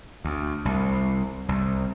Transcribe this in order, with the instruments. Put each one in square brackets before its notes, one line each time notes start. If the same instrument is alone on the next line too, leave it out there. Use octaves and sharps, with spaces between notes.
[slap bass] D2
C2
C2